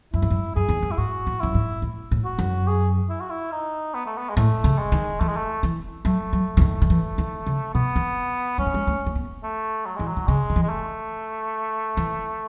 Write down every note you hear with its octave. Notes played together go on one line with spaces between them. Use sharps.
F#2 E4
G#2
F#2
F#2 G#4
E2
F#2
E4
G#2 F#4
A2
F#2 E4
G#2
A2
A2
F#4
F#2
G#4
E4
F#4
E4
D#4
B3
A3
B3
G#3
A2 A3
C#3
G#3
D#3
E3 A3
G#3
A3
E3
F#3 A3
F#3
E3
D#3
D#3
E3
D#3
C#3
B2 B3
D#3
G#3 C#4
A3
G#3
A3
A3
B3
A3
F#3
E3 G#3
F#3
D#3
C#3 G#3
D#3
E3
G#3
A3
E3